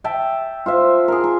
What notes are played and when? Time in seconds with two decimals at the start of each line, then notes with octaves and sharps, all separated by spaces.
0.04 E5 G5 A5
0.66 F4 C5 E5
1.08 G#4 A#4
1.24 A#4